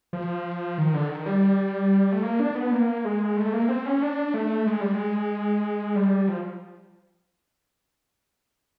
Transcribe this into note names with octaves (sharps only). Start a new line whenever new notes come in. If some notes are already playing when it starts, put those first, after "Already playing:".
F3
D#3
D3
D#3
G3
A3
A#3
D4
B3
A#3
G#3
A3
A#3
C4
C#4
D4
A3
G#3
G3
G#3
G3
F3